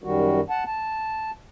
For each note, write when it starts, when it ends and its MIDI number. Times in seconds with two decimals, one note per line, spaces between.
0.04 0.41 42
0.04 0.41 51
0.04 0.41 55
0.04 0.41 66
0.50 0.64 78
0.50 0.64 81
0.66 1.31 81